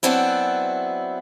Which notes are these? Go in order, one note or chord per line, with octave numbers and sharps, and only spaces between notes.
F#3 B3 C4 D4 E4